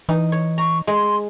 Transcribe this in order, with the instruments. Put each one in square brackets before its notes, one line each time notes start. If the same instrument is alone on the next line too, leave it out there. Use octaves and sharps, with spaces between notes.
[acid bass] E3 [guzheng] D#4
[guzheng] C#5
[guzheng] A#5 [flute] C#6
[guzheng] G#3 [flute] C6